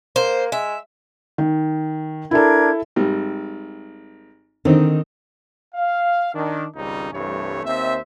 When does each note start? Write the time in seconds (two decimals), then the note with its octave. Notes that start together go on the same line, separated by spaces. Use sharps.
0.16 A#3 C5
0.52 G#3 E5
1.38 D#3
2.31 D4 E4 A4 A#4 G#6
2.96 G#1 G3
4.65 D3 D#3 C4 D#4
5.74 F5
6.34 D#3 D4
6.76 G#1 C#2 G3 C#4 D#4
7.13 C2 G2 E3 A3 C#5
7.64 D#2 C4 C5 E5